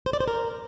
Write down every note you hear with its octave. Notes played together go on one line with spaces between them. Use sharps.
C5
D5
C5
A#4